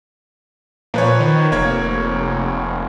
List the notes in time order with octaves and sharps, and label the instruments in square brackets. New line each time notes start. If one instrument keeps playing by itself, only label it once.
[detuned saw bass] A#2 [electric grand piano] F3 B4 C#5
[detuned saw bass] D#3
[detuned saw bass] F1 [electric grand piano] A#3 C#5 G#6